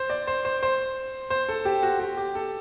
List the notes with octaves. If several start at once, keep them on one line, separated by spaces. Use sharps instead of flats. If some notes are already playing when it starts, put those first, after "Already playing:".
Already playing: C5
D5
C5
C5
C5
C5
A4
G4
F#4
G4
G4
A4